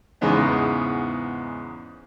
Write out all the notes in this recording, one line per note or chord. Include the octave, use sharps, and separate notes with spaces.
E2 G#2 C#3 G#3 B3 D#4